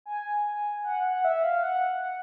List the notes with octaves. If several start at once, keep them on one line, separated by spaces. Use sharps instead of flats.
G#5
F#5
F#5
E5
F5
F#5